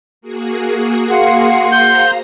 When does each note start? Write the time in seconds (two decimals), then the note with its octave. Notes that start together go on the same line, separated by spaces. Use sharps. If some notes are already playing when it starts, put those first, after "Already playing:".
0.21 A#3 F#4 G#4
1.10 F5 F#5 C6
1.72 C5 A#5 G6